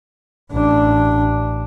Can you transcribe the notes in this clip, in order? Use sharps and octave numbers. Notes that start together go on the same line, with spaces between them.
A1 D4